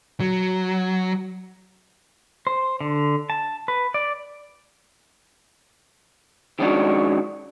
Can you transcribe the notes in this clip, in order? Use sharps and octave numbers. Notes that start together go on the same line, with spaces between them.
F#3
C5
D3
A5
B4
D5
D#3 F3 G#3 C#4 D4 F#4